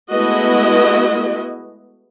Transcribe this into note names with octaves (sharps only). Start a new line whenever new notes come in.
G#3 A3 B3 E4 F#4 D#5